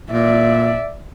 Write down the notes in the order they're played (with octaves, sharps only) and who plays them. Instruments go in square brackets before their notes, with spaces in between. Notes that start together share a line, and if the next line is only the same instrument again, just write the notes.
[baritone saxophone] A#2 [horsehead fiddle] D5 E5